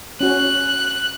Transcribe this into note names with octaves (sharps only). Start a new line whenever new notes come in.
C#4 F#4 C#5 F#6